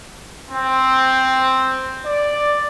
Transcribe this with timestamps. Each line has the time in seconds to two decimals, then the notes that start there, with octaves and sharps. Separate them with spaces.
0.51 C4
2.04 D5